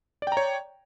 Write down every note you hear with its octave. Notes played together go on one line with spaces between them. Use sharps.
C#5 D5 G5 A#5